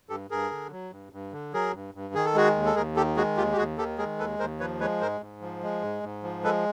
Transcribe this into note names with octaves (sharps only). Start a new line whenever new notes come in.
G2 G4 A4
G2 G#4 A#4
D3
F#3
G2
G2
D3
F#3 G#4 A#4
G2
G2
D#3 G#4
A4
G#3 F#4 G#4
D#2
A4
D#2 G#4 A#4
D#3 G4 A4
G#3 F#4 G#4
D#2 F4 G4
G4
D#2 F#4 G#4
D#3 G4 A4
G#3 G#4 A#4
D#2 A4 B4
D#2 A#4 C5
F3 B4 C#5
G#3 B4 C#5
G#2 A#4 C5
G#2
F3
G#3
G#2
G#2
F3
G#3 A4 B4